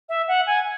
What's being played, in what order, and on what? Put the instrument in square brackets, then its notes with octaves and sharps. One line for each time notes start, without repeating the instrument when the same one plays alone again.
[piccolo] E5
F#5
G#5